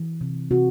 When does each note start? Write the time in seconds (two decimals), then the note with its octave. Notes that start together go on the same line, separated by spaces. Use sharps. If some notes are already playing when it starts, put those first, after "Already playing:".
Already playing: E3
0.21 C3
0.51 C3 F#4